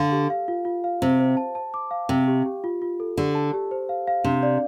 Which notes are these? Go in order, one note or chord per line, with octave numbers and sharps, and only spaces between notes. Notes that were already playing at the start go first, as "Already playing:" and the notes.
Already playing: D3 F5
G4
F5
F4
F4
F5
C3 C5
C5
A5
A5
D6
F5
C3 G5
G4
G4
F4
F4
A4
D3 G4
A5
G4
C5
F5
F5
C3 D4
D5